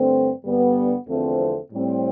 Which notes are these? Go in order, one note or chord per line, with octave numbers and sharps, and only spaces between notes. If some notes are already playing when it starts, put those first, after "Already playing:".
Already playing: G2 D3 A3 C4
G2 D3 G3 B3
E2 D3 F3 A3 C4
A2 G3 C4